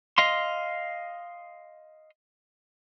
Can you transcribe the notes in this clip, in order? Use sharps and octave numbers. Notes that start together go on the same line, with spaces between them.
D#5 F5 C6